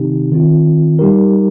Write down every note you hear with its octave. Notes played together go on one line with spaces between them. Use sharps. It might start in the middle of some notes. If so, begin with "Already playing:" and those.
Already playing: C3 D#3 C4 D#4 G4
D#3 C4 F4
G3 D#4 G4 A#4